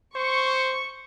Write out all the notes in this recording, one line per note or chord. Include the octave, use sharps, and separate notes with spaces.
C5 C#6